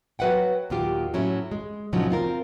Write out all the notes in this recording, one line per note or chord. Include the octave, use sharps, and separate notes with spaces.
F#3 F#4 B4 E5 F#5 G5
D#2 A#2 D#3 F#3 F4 G4
A2 F#3 A3 C#4 E4
G#3
A#2 C#3 F3 F#3 D4 D#4
C4 F4 A#4